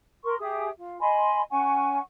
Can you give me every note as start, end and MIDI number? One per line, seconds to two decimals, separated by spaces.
0.23 0.34 70
0.23 0.34 84
0.23 0.34 85
0.39 0.68 67
0.39 0.68 68
0.39 0.68 76
0.39 0.68 87
0.78 0.98 65
1.00 1.41 75
1.00 1.41 80
1.00 1.41 83
1.00 1.41 84
1.50 1.99 61
1.50 1.99 78
1.50 1.99 80
1.50 1.99 85